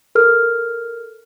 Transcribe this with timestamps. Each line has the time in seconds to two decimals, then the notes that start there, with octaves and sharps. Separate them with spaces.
0.15 A4 A#4 F6